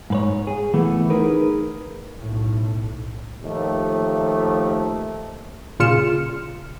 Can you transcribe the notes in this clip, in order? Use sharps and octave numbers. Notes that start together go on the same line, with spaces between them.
G#2 B4 C#5
G#4
E3 A3 B3
D#4 G#4 A#4 B4
B1 A2
D#2 F3 A3
A#2 C#3 F4 F6 C#7 E7